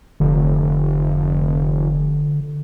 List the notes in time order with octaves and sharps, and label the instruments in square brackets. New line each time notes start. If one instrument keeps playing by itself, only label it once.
[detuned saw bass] F1 [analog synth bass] D3